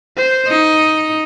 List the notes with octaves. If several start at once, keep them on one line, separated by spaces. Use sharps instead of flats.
C5
D#4